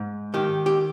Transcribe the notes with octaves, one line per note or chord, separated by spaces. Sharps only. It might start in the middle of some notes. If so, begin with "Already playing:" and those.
Already playing: G#2
D#3 G4
G4